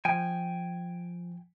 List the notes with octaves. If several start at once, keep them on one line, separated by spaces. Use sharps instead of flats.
F3 G5 G#5